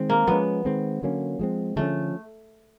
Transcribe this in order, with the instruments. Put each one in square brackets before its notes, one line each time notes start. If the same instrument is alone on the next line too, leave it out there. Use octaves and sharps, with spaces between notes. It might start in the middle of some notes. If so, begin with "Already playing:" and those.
Already playing: [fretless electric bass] D#3 G#3 C4
[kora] A#3
[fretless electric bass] F3 G#3 C#4 [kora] B3
[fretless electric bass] D#3 G#3 C4
D3 F#3 A#3 C#4
F3 G#3 C4
[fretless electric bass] D3 F3 G#3 C#4 [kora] A3